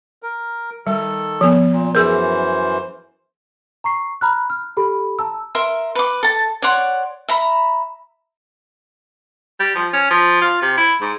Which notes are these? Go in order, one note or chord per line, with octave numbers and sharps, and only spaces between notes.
A#4
D#3 G3 A4
F3 B3
A#2
F#2 E3 G#4 A#4 C5
A#5 C#6 C7
A#5 B5 F6 F#6
F6
G4 A4 B5
A5 A#5 E6
A#4 E5 C6
B4 D6
A4 A5
C#5 D5 F#5 C6
E5 A#5 B5
G3
F3
C#4
F3
F4
C3
E4
G#2